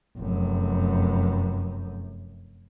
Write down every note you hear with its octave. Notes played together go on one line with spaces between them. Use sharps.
F1 F#2